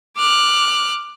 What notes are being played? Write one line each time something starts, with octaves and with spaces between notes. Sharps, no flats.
D6 F6 F#6